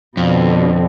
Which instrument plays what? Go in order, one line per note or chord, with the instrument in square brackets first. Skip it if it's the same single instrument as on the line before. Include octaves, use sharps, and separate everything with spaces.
[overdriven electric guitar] F2 [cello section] B2 D3